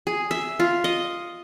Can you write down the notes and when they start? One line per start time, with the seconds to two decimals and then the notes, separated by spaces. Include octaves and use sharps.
0.07 G#4
0.31 E5
0.60 F4
0.84 D#5